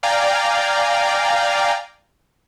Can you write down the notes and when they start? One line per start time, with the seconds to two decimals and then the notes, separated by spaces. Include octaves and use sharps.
0.03 D5 F5 G5 G#5 A#5